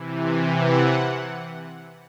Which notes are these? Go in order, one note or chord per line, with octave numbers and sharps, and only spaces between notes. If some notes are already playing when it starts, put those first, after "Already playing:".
Already playing: C3 E3
G#5
F#5